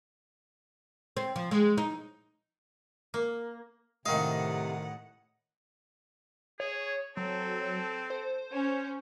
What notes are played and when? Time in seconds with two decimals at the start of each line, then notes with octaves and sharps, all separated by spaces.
1.17 C4
1.36 F3
1.51 G#3
1.78 D#4
3.14 A#3
4.06 A2 C3 D#3 D#5 F5 F#5
6.60 G#4 C#5
7.17 F#3 C4 A4
8.10 C5
8.52 C#4 C#5